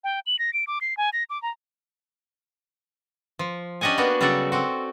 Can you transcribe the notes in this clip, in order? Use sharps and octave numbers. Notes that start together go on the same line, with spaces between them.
G5
F#7
A#6
D7
D6
C7
G#5
A#6
D6
A#5
F3
C#4 D4 G4 D#5 F#5 G#5
A#3 B3 D4 F#4
C#3 F#3 G3 F#4 A4 D5
C4 F#4